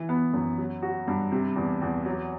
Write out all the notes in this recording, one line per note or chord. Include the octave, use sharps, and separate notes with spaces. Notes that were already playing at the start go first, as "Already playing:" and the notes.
Already playing: E3
B3
F#2
F#3
F#4
G2
C3
E2
E2
F#3